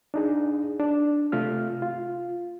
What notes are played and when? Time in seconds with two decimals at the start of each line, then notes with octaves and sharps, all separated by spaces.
0.14 D4 D#4 G#4
0.80 D4
1.32 C3 A3 F4 F6
1.82 F4